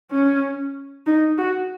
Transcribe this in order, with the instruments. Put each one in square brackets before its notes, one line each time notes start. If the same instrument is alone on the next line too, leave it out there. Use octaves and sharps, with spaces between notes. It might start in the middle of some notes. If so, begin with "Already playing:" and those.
[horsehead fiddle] C#4
D#4
F#4